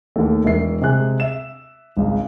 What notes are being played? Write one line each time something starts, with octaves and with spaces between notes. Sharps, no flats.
D#2 A3
E1 A#4 E5 C7
C3 G#3 G#5 F#6
E5 E7
G#1 C#2